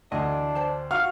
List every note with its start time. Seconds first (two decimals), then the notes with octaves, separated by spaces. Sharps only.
0.12 D2 E3 D4 D#5
0.55 C5 G5 A5
0.91 F#4 F5 F6